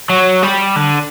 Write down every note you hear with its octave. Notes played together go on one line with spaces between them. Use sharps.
F#3
G3
D3